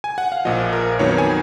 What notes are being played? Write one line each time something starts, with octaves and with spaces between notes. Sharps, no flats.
G#5
F#5
F5
A#1 A#2 F3 D#5
A#4
F2 D#3 F#3 B3 C#5
G#5